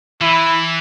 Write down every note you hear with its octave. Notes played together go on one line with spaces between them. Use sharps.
E3 E4